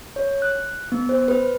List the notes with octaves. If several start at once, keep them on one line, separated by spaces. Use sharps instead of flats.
C#5
F#6
B3
C5
B4